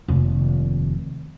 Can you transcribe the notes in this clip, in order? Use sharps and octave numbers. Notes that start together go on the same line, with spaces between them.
F1 D#2